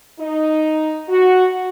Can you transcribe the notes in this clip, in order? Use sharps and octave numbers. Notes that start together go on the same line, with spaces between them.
D#4
F#4